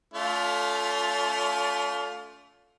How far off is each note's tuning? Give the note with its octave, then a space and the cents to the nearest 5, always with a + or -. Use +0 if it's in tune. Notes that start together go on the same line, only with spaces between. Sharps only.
A3 +0 C#4 +45 F4 +15